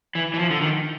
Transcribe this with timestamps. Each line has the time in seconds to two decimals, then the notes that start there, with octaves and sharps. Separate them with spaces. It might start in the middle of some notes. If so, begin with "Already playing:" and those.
0.15 E3
0.34 E3
0.39 F3
0.50 D3
0.61 D#3